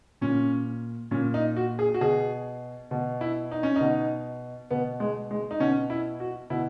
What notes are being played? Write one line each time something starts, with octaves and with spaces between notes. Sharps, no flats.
A#2 C#4
A#2 C#4
D#4
F#4
G#4
F#4
B2 G#4
B2
E4
D#4
C#4
B2 D#4
B2 B3
G#3
G#3
D#4
B2 C#4
E4
F#4
B2 E4